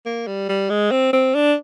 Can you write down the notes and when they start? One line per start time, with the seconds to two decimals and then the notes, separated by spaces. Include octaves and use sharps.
0.06 A#3
0.27 G3
0.49 G3
0.70 G#3
0.91 C4
1.13 C4
1.35 D4